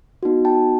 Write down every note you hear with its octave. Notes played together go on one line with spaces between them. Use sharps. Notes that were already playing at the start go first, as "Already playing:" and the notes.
B3 D#4 F#4
G5 A5